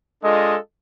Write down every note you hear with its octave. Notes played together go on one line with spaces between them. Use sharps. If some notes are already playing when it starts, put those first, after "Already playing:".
G#3 D4 F4 A4 D#5